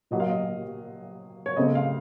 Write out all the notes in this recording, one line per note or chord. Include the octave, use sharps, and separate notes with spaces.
A#2 F#3 A#3 D#5
F5
D#5
C#5
C#3 A3 C4 D#5
F5